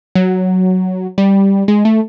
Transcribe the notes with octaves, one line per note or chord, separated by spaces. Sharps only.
F#3
G3
G#3
A3